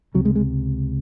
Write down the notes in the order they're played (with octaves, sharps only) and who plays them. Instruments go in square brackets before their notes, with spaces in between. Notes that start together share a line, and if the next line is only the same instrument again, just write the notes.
[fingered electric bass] C#2 C3 F#3
G#3
G#3